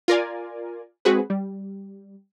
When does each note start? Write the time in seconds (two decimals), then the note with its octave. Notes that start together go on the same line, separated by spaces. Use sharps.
0.08 F4 A#4 D5 G#5
1.05 G#3 C4 F#4 G#4 B4
1.30 G3